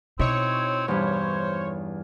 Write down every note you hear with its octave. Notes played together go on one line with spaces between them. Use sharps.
B2 C4 D#4 E4 C#5
E2 G2 C5